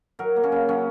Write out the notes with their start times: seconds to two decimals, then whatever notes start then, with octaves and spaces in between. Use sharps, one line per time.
0.19 F#3 A#4
0.36 A#3
0.43 C#4
0.52 C#3
0.69 F#3 C#4